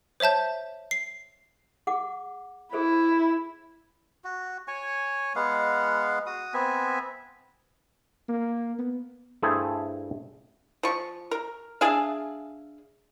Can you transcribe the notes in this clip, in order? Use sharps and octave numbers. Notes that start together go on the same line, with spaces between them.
C5 C#5 E5 A5 G6
C7
G#4 F#5 D6
E4 G#4 A4 C5
F#4
C#5 G#5 C#6
G#3 B3 F5 F#5
F#4 D#6
B3 C4 E5 G#5
A#3
B3
G2 A3 E4 G#4 A4 C5
F3 C#6
A#4
D4 G#4 E5 F5